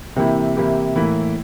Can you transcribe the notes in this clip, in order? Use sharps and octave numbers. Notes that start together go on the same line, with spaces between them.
C3 E3 A#3 E4 G4
C3 E3 A#3 E4 G4
A2 E3 A#3 E4